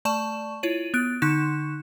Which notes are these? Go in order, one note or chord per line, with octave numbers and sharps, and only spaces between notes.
A3 D5 A5 C#6 E7
E4 F4 C#5 D#7 F#7
B3 F#6 D7
D3 D#4 C6 C#6 F#6 E7